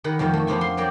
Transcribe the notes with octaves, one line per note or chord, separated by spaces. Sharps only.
D#3 B4 F#5
F2 D#3 G3 A3
A3
F2 F3 B3 D4 F4 G#5
C6
F#3 A#3 G4 D5